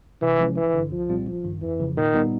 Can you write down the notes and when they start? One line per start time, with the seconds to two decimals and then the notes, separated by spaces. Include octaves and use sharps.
0.22 C3 E3
0.39 F3 G#3 C#4
0.56 G#1 E3
0.74 G2 D3
0.91 C2 F3
1.09 A#2 G3 C4 F4
1.27 A1 F3
1.44 G2 D#3
1.62 F2 E3
1.80 C#3 F3
1.97 A#2 D#3
2.14 G3 B3 D#4